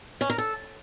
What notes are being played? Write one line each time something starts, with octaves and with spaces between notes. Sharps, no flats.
C#4
A#4
A4